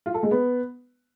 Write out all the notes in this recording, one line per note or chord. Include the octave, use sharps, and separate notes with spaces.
F4
A4
G#3
B3